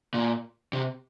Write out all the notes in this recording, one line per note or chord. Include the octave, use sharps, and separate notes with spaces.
A#2
C3